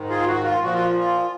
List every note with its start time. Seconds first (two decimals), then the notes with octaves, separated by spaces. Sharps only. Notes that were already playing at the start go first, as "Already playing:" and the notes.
Already playing: G#2 D#3
0.10 F4 G#4
0.27 F#4
0.44 F4
0.62 A#2 F3 F#4
0.74 F4
0.98 F4